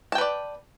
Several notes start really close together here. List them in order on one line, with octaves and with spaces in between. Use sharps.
A5 G5 B4 D5